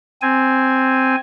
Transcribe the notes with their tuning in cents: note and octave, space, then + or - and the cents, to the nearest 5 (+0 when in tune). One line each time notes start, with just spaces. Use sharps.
C4 +0 G#5 +0